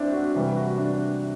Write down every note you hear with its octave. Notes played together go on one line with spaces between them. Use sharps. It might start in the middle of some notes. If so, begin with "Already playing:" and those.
Already playing: C4 D4 E4
F#4
C3 E3 G3 G4
F#4
D4